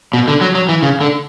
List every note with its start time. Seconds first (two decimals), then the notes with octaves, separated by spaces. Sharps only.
0.13 B2
0.28 D3
0.41 F#3
0.55 F#3
0.69 E3
0.83 C#3
1.01 D3